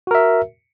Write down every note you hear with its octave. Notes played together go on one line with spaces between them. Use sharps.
F#4 A#4 E5